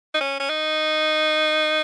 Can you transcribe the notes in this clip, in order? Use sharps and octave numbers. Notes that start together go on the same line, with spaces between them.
D#4
C#4
C#4
D#4